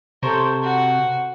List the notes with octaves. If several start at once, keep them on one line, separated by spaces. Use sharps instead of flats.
C3 A4 A#4 C5 C#5
F#4